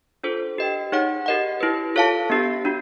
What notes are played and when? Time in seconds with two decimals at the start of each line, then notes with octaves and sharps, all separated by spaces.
0.24 D4 F4 A4 C5
0.58 G4 B4 D#5 G5
0.92 D#4 G#4 C#5 F#5
1.26 G4 A#4 D#5 F#5
1.60 E4 G4 B4
1.96 F4 A4 C#5 F5 A5
2.30 B3 D4 G4
2.65 D4 F#4